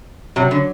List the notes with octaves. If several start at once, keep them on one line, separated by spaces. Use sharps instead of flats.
C3 F#3
D3